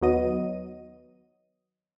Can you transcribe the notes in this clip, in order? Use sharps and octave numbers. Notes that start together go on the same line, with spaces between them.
D#2 D#3 F#3 B3 D#5 D#7